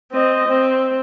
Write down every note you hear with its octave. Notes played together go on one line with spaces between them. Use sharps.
C4 D#5
C4